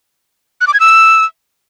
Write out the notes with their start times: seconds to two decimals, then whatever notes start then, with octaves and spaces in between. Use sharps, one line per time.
0.61 F#6
0.67 D6
0.74 G#6
0.80 E6